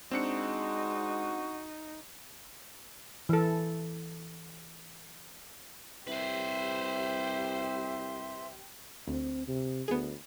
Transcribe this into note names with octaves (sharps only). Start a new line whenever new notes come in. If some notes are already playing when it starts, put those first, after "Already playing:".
G#3 C4 D4 D#4 F#4 C#7
E3 A4
C2 G4 B4 C5 E5
D2 C4
C3
D2 B3 G#4